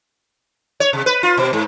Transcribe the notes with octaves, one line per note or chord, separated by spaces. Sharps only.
C#5
C3
B4
F4
B2
G#2